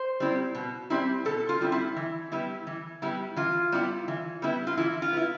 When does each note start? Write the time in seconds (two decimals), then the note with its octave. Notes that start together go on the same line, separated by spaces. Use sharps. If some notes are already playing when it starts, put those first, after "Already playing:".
Already playing: C5
0.20 G3 C4 E4
0.55 B2
0.90 G3 C4 E4
1.25 B2 A4
1.49 F4
1.60 G3 C4 E4
1.72 E4
1.96 E3
2.32 G3 B3 E4
2.67 E3
3.02 G3 B3 E4
3.36 E3 F4
3.72 G3 B3 E4
4.08 E3
4.42 G3 B3 E4
4.67 F4
4.77 E3 E4
5.02 F4
5.13 B3 E4